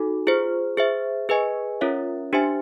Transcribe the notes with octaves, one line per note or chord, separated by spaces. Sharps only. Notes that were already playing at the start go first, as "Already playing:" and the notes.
Already playing: D#4 F#4 A4
F4 G#4 C5
G#4 C5 E5
G#4 B4 D#5 G#5
C#4 F4 A#4 C#5 E5
D4 G4 C5 E5 G#5